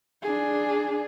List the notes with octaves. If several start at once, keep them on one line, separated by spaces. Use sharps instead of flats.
D4 G#4